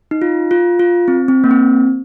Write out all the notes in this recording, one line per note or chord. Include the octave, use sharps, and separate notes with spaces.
D#4
F4
F4
F4
C4
C4
A#3
C4